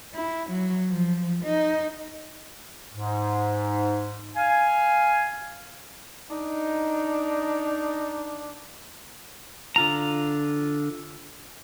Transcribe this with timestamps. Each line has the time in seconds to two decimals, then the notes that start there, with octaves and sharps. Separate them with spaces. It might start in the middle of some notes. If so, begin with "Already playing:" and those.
0.14 E4
0.50 F#3
0.89 F3
1.43 D#4
2.93 G#2
4.36 F5 G#5
6.30 D4 D#4
9.76 D3 F4 A#5